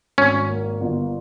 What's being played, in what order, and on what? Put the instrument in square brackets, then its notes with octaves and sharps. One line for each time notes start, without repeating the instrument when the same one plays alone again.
[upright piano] G#1 [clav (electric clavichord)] C#4
[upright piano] A#3
G1